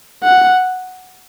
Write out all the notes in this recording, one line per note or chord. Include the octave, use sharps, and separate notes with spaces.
F#5